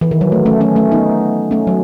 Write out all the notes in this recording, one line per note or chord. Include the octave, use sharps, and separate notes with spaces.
E3
D#3
F#3
A3
A3 C#4
A3 C#4
A3 C#4
B3 D#4
A3 C#4
F#3